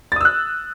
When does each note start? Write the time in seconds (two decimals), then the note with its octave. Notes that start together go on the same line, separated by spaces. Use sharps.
0.12 A6
0.16 D#6
0.21 E6
0.25 F#6